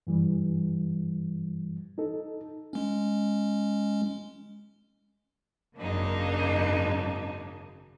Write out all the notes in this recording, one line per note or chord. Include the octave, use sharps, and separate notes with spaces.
G2 E3 G3
D#4 A4
G#3 C#4
G#1 F#2 C#3 A#3 D4 D#4